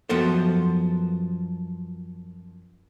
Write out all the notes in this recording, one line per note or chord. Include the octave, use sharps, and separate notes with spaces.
F#2 F3 B3 A4 C5